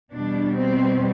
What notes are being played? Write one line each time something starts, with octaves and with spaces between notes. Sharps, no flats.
E2 B2 G3 D4
C4